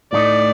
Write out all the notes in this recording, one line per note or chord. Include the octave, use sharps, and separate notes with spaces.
A2 A3 D#4 D5